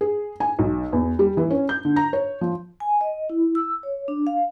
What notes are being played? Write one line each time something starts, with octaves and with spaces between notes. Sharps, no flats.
G#4
G#5
B1
E2
G3
E3
C#4
G6
D3
A#5
C#5
F3
G#5
D#5
E4
E6
C#5
D4
F5